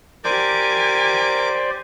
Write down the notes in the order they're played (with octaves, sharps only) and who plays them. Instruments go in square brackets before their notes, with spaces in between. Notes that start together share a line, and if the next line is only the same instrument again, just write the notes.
[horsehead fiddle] G4 G#5 [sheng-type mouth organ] A#4 D6 [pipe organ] C5 D5